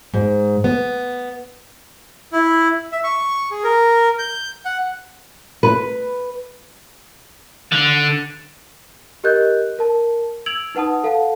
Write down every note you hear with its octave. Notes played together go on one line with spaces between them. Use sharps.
G#2
B3
E4
E5
C#6
G#4
A#4
G6
F#5
B4
D3
G4 A#4 D#5 F#6 G6
A#4 A5
E6 G#6 D7 F7 F#7
D#4 B4 F#5 A5 D#6
A4 F5 F#5 A5